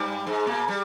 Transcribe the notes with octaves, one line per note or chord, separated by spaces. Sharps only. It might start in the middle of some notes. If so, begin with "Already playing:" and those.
Already playing: G2 G3
G#2 G#3
A#2 A#3
G3